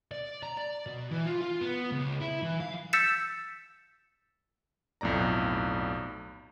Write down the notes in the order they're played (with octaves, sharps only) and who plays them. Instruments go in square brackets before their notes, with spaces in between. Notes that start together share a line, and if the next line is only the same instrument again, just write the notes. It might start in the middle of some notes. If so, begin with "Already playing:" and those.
[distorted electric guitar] D5
A#5
D5
B2
E3
F4
F4
B3
C#2
E4
E3
F5
[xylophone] E6 G6 A6 B6 C#7 E7
[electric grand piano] B1 F2 A2 D5 A#5